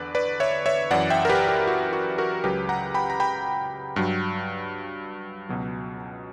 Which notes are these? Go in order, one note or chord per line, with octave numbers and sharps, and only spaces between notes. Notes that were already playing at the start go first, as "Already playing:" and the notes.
Already playing: E2 D3 B4 D5
B4 D5
C#5 E5
C#5 E5
F#2 E3 D5 F#5
E5 G5
A#4
G4 B4
G4
F#4
F#4
F#4 A#4
C#2 C#3 F#3 G4 B4
F#5 A#5
G5 B5
A#5
G5 B5
G2 F#3
C#2 B2 F#3